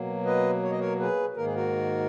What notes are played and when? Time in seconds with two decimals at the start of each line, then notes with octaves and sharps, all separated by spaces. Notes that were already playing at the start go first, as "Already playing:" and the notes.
Already playing: B2 F#3 A#3
0.25 B4 D#5
0.63 C#5
0.71 D#5
0.79 A#4 C#5
0.99 G#4 B4
1.36 G#2 D#3 A#3 A#4
1.46 G#4
1.54 F#4 A#4